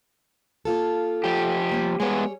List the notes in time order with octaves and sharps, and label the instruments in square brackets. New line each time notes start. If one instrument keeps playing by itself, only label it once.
[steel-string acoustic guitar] A#3 F4 A4
[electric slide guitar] F3 G4
[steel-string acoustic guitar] G3 A#3 C#4
[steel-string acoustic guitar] G3 G#4 C#5 [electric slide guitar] G#3 B3